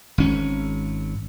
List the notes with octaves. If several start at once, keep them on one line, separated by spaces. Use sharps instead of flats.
G#1 C#4